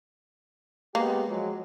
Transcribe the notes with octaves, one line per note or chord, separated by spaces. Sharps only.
G#3 A#3 B3 G4
F3 F#3 G#3